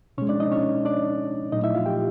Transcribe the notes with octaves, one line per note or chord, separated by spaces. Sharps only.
B2 G#3 C#4 C#5
D4 D5
D#4 D#5
C#4 C#5
D4 D5
A#2 F#3 A3 D#4 D#5
E4 E5
F4 F5
G4 G5